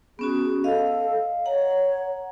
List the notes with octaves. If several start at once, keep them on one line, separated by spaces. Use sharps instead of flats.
B3 C#4 F#4 G#4
A4 D#5 F5
C#5 F#5 A#5